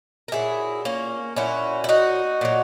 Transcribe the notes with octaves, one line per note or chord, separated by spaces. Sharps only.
A#4
A#2 F#3 E4 G#4
A#3 C#4
A#2 F#3 C#4 E4
E4
D#4 F#4
A#2 F#3